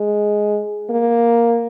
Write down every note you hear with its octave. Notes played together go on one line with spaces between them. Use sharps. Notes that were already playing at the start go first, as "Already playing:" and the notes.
Already playing: G#3
A#3